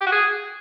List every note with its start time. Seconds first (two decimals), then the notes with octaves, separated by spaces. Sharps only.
0.01 G4
0.07 F#4
0.12 G#4